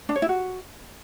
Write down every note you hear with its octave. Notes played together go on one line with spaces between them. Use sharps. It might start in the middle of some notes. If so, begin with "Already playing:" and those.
D4
C#5
E4
F#4